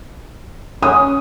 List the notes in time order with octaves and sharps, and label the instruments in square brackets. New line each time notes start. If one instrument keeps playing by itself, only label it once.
[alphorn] C#4 [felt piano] D#6